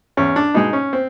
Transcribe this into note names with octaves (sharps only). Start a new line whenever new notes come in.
E2 C#4
D4
B2 G#3 D#4
C#4
C4